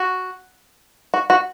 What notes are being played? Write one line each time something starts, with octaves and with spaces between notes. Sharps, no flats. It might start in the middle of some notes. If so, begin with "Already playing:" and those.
Already playing: F#4
F#4
F#4